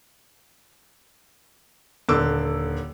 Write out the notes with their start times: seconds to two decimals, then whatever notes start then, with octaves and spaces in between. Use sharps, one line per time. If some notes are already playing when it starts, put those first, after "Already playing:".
2.09 D#1 D3 D6 E6